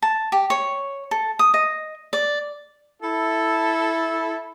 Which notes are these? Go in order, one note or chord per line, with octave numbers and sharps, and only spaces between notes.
A5
G4
C#5
A4
D#6
D#5
D5
E4 A4